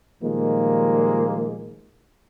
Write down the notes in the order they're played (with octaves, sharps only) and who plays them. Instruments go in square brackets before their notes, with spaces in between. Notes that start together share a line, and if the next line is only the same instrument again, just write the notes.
[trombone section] A#2 D#3 F3 G3 G#3 A#3